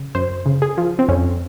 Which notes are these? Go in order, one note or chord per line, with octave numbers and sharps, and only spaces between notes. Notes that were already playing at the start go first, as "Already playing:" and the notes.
Already playing: C#3
F#2 C5
C#3
G#4
F3
C4
F2 C#4